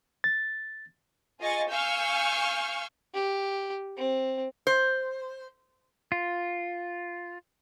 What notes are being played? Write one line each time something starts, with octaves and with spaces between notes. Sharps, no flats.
A6
F4 G#4 D#5 G#5 C#6 A6
F5 G#5 C#6 E6 F6 G6
G4
C4
C5
F4